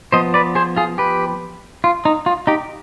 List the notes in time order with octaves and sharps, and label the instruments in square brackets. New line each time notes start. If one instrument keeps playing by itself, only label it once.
[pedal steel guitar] F3 B3 C5 D#5
B4 D5
G#4 C5
F4 G#4
G4 B4
F4
D#4
F4
D#4 G4